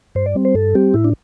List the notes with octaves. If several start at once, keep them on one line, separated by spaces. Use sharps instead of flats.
G2 C5
D5
G3 C4
C5
G2 A4
G3 C4 G4
A2 E4
D4